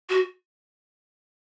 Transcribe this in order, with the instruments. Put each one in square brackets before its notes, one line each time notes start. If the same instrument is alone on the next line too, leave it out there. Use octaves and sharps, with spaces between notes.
[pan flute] F#4